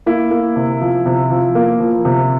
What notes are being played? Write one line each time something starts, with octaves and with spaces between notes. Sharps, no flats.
A#3 E4
A#3
C3
F3
C3
F3
A#3
F3
C3